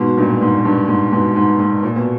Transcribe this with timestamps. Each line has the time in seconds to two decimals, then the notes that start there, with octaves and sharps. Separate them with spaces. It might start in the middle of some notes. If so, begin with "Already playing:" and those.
Already playing: G#2 B2
0.17 G2 A#2
0.41 G#2
0.65 G2
0.88 G#2
1.12 G#2 B2
1.36 G#2
1.59 G#2
1.83 A#2
1.96 B2